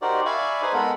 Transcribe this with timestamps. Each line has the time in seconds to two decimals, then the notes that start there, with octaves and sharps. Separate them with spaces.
0.02 D#4 F#4 G4 A#4 C5 D5
0.26 D5 E5 F5 G#5 B5 C#6
0.62 D#4 G#4 B4 C5 G#5
0.73 G#3 B3 A4 A#4 F#5 B5